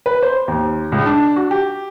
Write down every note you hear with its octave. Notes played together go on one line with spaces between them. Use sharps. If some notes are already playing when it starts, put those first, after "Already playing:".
B4
C5
D#2
C#2
D4
F#4
G4